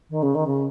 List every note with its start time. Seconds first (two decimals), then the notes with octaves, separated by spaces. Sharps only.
0.10 D#3
0.23 C#3
0.35 D#3
0.47 C#3